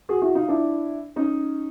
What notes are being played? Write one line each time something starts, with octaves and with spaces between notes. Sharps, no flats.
F#4 G#4
E4 F#4
D#4 F4
D4 E4
C#4 D#4